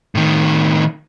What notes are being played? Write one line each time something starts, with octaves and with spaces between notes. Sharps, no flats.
A2 D#3